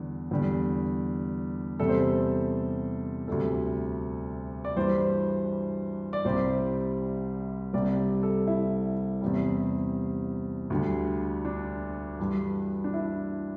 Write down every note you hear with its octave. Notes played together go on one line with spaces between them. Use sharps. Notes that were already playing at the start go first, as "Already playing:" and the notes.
Already playing: E2 D3 G3
E2 D3 G3
E2 C3 G3 A4
C5
A4
D2 C3 G3 A4
D5
G2 E3 G3 C5
D5
C2 C3 G3 C5
C2 C3 G3 D5
A4
E4
E2 C3 G3
D2 D3 G3
D4
G2 E3 G3
D4
E4